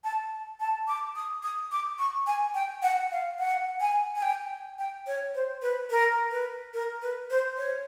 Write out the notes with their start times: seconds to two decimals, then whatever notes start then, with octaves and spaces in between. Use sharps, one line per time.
0.04 A5
0.60 A5
0.88 D6
1.16 D#6
1.43 D#6
1.72 D6
1.99 C#6
2.27 G#5
2.55 G5
2.83 F#5
3.11 F5
3.39 F#5
3.81 G#5
4.15 G#5
4.22 G5
4.79 G5
5.07 C#5
5.35 C5
5.62 B4
5.90 A#4
6.32 B4
6.74 A#4
7.02 B4
7.30 C5
7.57 C#5